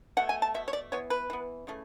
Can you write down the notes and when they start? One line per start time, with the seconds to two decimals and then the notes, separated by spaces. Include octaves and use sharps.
0.17 B2 A3 F#5
0.29 G#5
0.42 A5
0.54 B2 A3 E5
0.68 C#5
0.73 D5
0.92 E3 B3 C#5
1.10 B4
1.30 E3 B3
1.67 C#3 E3 A3